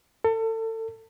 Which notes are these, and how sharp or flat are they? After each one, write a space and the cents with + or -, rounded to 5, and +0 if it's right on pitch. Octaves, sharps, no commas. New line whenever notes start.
A4 +30